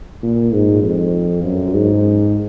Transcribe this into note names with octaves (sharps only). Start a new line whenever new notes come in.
A#2
G#2
F2
F#2
G#2